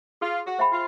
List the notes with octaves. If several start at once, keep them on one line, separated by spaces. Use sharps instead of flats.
F4 G#4
F#4
C5 E5 G5 B5
F4